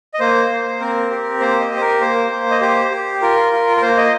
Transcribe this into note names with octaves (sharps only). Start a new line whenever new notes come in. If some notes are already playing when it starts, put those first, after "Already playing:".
D#5
A#3 C5
A#3
C4 A#4
G4
A#3 C5
D#5
G4
C5
A#4
A#3 C5
A#3
D#5
G4 C5
G4
F4 A#4
F4
A#4
A#3 C5
D#5